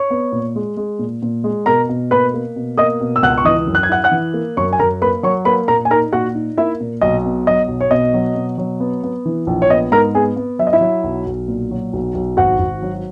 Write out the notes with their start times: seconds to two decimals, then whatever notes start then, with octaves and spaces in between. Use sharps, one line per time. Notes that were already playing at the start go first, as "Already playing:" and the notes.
Already playing: C#5 C#6
0.10 B3
0.32 A#2
0.56 G#3
0.77 G#3
0.99 A#2
1.22 A#2
1.44 G#3
1.66 B2 A#4 A#5
1.89 B2
2.11 A#3 B4 B5
2.34 A#3
2.56 B2
2.78 A#3 D#5 D#6
3.01 B2
3.16 E6
3.23 C#2 F#5 F#6
3.38 C#6
3.45 E3 D#5 D#6
3.67 F#2
3.75 F#6
3.83 G#6
3.89 E4 F#5 F#6
4.04 F#5 F#6
4.11 E3
4.34 A#3
4.57 F#2 C#5 C#6
4.73 G#5
4.80 F#2 A#4 A#5
5.01 A#3 B4 B5
5.23 F#3 C#5 C#6
5.45 A#3 B4 B5
5.68 A#2 A#4 A#5
5.85 G#5
5.90 D#4 A#4 A#5
6.13 A#2 F#4 F#5
6.35 D#4
6.58 A#3 E4 E5
6.80 A#2
7.01 B1 D#5
7.25 B2
7.47 F#3 D#5
7.68 B1
7.81 C#5
7.91 B2 D#5
8.14 F#3
8.35 B2
8.58 F#3
8.80 B3
9.03 B3
9.25 E3
9.47 A#1
9.62 C#5
9.70 B3 D#5
9.92 G#2 A#4 A#5
10.15 B3 G#4 G#5
10.36 B3
10.59 F#3 E5
10.67 D#5
10.73 E4 E5
10.81 F#3
11.04 B1
11.27 B1
11.48 A#2
11.71 F#3
11.93 B1
12.15 B1
12.37 G#1 F#4 F#5
12.59 G#1
12.82 F#3